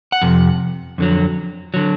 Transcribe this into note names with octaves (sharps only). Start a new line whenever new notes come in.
F#5
F2 C3
F2 D3 F#3
D3 F#3